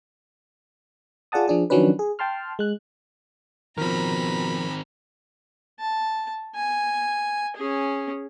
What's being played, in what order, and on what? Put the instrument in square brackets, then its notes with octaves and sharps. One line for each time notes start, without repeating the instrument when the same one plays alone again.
[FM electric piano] F4 G#4 D5 F#5 A5 D#6
F3 D4 G#4
D#3 F3 F#3 C#4 D4 B4
G#4
G5 A5 C6 F6
G#3 F#6
[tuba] B2 [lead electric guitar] D#3 C4 [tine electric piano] F3 A#4 [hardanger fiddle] A#5 B5
[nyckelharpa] A5
G#5
C#4 G#4